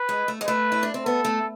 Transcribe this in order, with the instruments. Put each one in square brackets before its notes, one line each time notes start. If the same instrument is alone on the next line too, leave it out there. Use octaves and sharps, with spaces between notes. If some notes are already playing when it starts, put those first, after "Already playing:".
Already playing: [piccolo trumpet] B4
[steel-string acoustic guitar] G#3
A3
G#3
[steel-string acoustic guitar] A3 [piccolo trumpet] B4
[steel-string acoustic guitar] E4
D4
C4
[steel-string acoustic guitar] B3 [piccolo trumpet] A4
[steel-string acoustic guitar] A3